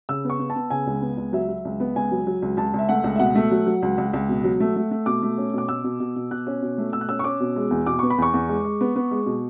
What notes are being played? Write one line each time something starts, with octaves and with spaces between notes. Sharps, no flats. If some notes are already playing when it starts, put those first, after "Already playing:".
C#3 E6
B3 C#6
B3
A5
B3
C#3 G#5
C#2
B3
C#2
F#3 E5
F#3
C#2
B3
C#2 G#5
F#3
F#3
C#2
C#2 A5
C#2 E5
A3 F#5
C#2
E5
B2 F#5
A3
F#3
F#3
C#2
C#2
C#2
B2
F#3
A3
A3
A3
B2 D6
A3
C#4
B2 D6
B2 E6
B2
B2
B2
B2 F#6
C#4
B2
A3
B2 E6
F#6
C#4 E6
C#6
C#4 D6
B2
G#3
E2
B2 D6
B3 C#6
B5
E2 C#6
E2
G#3
G#3
B3
B3
G#3
B2